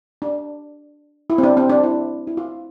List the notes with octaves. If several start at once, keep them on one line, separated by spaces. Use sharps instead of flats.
D4
E4
C4
D4
C4
D4
E4
E4
F4